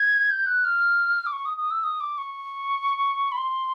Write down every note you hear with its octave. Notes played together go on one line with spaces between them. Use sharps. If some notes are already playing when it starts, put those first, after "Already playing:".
Already playing: G#6
G6
F#6
F6
D6
C#6
D#6
D#6
E6
D#6
D6
C#6
B5
C6